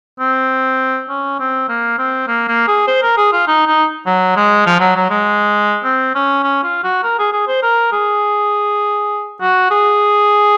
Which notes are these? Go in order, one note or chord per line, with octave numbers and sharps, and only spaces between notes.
C4
C#4
C4
A#3
C4
A#3
A#3
G#4
C5
A#4
G#4
F4
D#4
D#4
F#3
G#3
F3
F#3
F#3
G#3
C4
C#4
C#4
F4
F#4
A#4
G#4
G#4
C5
A#4
G#4
F#4
G#4